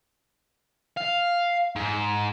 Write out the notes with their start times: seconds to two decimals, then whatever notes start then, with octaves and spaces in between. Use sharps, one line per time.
0.97 F5
1.76 G#2